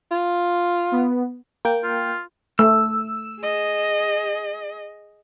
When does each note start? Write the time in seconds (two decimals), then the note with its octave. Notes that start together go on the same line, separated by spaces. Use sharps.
0.11 F4
0.92 B3
1.65 A#3 G5
1.83 F4
2.59 A3 E6
3.40 G#4 D#5